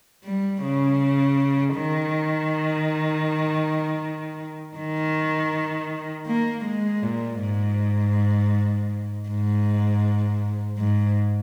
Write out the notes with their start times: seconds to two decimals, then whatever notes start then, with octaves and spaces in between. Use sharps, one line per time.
0.24 G3
0.63 C#3
1.76 D#3
4.77 D#3
6.27 A#3
6.65 G#3
7.03 A#2
7.41 G#2
9.29 G#2
10.79 G#2